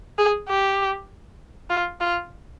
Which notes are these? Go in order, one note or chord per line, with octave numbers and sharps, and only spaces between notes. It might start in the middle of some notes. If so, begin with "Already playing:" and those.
G#4
G4
F4
F4